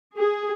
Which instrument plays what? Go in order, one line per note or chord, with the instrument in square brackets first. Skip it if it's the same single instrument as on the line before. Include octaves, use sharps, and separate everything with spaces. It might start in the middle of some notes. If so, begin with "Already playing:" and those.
[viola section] G#4